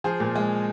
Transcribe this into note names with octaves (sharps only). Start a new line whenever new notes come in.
F3 G#4 C5
A#2
G#3